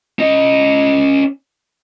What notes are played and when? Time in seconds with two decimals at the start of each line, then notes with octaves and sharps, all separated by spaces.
0.19 C#4 D#5